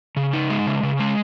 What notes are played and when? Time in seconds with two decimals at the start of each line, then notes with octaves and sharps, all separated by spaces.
0.17 C#3
0.33 D#4
0.50 G#3
0.67 C#3
0.83 C#3
0.99 G#3